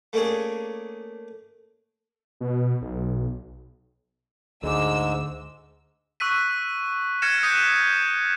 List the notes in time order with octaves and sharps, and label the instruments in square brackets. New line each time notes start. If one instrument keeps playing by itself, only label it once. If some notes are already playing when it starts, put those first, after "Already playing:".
[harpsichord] A3 A#3 C#4 D4 G#4
[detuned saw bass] B2
B1
[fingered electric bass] D2 [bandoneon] G#2 G#3 [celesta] G#4 D6 [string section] E6
[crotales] C#6 E6 F#6 B6 D#7
F6 G#6 A#6 C#7 E7
D#6 F#6 G6 B6 D#7